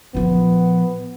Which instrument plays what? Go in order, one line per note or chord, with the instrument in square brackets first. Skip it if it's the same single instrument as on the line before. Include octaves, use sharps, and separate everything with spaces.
[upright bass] A#2 F3 [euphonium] B3